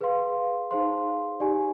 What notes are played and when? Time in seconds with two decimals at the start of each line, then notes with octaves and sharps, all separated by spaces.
0.01 G#4 B4 F5 C6
0.71 D#4 G#4 C5 F5 C6
1.40 D#4 G4 D5 G#5